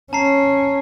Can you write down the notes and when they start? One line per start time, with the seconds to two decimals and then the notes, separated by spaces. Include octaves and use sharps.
0.13 C#4 A5 A#5 C7